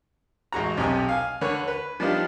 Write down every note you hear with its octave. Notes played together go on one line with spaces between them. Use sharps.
A1 G#3 F#4 A#5
B1 C3 G4 D#5 G#5 A#5
F5 G#5
D3 B4 C#5
B4
F3 G3 B3 D4 D#4 F4